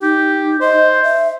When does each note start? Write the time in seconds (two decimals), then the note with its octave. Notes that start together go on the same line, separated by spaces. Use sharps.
0.02 D#4 G4
0.61 C5 D#5
1.04 E5